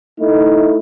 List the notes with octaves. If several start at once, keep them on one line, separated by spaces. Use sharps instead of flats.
A3 D#4 E4